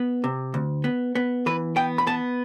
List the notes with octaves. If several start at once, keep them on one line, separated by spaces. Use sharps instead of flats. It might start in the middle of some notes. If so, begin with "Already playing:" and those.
Already playing: B3
C3
D2
B3
B3
E3 B4
B3 G5
B5
B3 A5